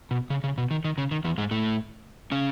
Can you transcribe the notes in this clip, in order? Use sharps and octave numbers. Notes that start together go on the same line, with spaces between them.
B2
C#3
C#3
B2
D#3
D#3
C#3
D#3
E2 E3
G#2 G#3
A2 A3
C#3 C#4